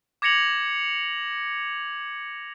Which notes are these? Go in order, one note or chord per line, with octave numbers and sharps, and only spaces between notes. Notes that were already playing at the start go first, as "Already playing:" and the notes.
D6 G#6 A#6 C#7 F7 F#7